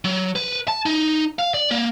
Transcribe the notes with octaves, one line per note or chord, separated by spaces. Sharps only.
F#3
B4
A5
D#4
F5
D5
A#3